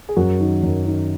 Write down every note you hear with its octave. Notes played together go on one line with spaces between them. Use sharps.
G#4
F#2 F#4 A#4
D#3
F#2
D#3